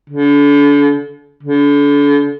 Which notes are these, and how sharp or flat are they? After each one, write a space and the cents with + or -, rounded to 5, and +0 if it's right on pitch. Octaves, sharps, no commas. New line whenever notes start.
D3 -35
D3 -35